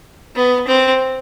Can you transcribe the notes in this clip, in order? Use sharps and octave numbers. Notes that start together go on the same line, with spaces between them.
B3
C4